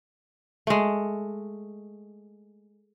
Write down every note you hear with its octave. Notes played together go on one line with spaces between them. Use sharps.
G#3 A3